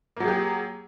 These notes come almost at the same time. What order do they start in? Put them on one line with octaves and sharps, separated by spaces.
A#3 F#3 G#4 G4